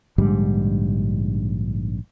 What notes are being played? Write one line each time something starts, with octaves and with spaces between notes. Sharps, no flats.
A#1 G#2 D3 G3